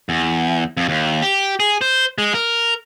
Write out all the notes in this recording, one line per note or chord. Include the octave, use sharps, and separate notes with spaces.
E2
F2
D#2
G4
G#4
C5
G#3
A#4